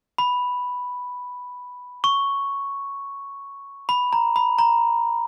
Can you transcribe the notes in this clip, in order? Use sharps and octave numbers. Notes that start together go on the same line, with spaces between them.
B5
C#6
B5
A#5
B5
A#5